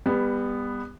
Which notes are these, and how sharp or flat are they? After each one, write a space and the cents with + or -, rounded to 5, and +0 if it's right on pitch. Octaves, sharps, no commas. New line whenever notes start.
G3 +30 B3 +0